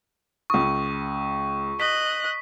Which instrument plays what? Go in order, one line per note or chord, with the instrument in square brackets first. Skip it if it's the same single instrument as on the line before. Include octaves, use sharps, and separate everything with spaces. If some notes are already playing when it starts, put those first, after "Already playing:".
[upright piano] C#2 D#6 [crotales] C#6
[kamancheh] D#5 F#6 [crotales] B6